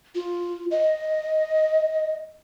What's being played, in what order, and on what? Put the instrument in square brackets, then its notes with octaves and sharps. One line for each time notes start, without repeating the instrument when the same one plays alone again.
[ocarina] F4
D#5